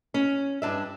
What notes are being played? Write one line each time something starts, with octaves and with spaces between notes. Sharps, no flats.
C#4
G2 B2 D4 E5